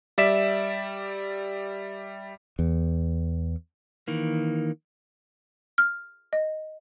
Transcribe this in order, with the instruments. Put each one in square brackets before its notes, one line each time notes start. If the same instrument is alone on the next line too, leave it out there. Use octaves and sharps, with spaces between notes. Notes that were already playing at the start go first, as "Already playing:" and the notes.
[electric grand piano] G3 D5 E5 B6 E7
[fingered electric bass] E2
[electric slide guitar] D#3 E3 A#3
[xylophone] F6
D#5